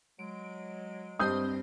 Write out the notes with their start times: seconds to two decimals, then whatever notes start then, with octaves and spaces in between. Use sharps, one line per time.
0.19 F#3 G#3 D7
1.19 G2 C4 C5 D#5 D#6 G6